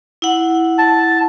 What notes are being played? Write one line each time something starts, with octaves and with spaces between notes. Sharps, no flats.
E4 F#5
A5